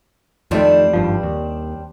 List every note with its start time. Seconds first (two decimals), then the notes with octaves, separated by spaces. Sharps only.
0.51 F2 D#3 G3 A3 C4 D4
0.93 G#1 G2 F3
1.23 D#2